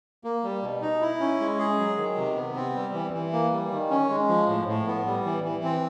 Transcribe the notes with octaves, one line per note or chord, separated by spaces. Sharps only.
A#3
G3
B2
D#4
E4
C#4
G#3
G#4
F#3
D#3
C3
B3
C4
G3
E3
E3
A#3
G3
D#3
C#4
G#3
F3
A2
A2
B3
G3
E3
E3
C4